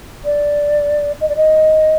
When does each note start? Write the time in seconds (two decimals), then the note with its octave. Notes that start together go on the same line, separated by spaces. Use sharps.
0.25 D5
1.20 D#5
1.29 D5
1.36 D#5